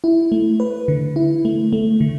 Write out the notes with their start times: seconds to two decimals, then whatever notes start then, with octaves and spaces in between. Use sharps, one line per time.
0.04 E4
0.32 A3
0.60 B4
0.88 D3
1.16 E4
1.45 A3
1.73 A3
2.01 D3